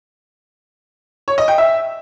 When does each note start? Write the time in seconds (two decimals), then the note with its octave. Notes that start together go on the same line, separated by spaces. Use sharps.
1.28 C#5
1.38 D#5
1.48 G5
1.58 E5